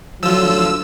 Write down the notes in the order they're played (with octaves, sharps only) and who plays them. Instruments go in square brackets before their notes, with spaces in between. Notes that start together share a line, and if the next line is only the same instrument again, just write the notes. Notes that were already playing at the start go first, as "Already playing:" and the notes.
[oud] D2 D3 E5 [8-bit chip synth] F3 F4 [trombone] F#3 [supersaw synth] E6